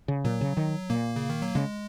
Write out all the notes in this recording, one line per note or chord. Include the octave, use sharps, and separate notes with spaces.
C#3
A#2 F#3
C#3
D#3
A#2 A#3
C#3
D#3
F#3
C#3 G#3